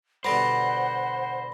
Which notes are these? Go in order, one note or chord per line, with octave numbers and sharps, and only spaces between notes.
B2 D3 G3 C5 F#5 B5 A#6